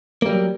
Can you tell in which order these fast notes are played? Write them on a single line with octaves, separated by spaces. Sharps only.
A#3 G3 F#3